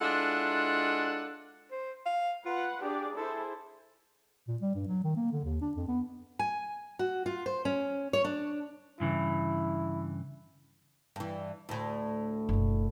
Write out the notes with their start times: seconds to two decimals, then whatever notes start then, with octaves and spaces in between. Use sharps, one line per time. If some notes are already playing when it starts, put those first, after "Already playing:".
0.01 G#3 D4 E4 F4 A4 F#5
1.71 C5
2.06 F5
2.45 F4 B4 F#5
2.81 D4 G4 G#4 D5
3.16 E4 G#4 A4 C5
4.48 A#2
4.62 G3
4.75 G2
4.88 F#3
5.04 D#3
5.16 A#3
5.32 D3
5.44 D#2
5.61 D4
5.77 F2
5.88 B3
6.39 G#5
6.99 F#4
7.26 F4
7.46 C5
7.65 C#4
8.13 C#5
8.24 D4
9.00 G2 C#3 E3 E4
11.16 G2 E3
11.69 D2 A2
12.49 F#1 B2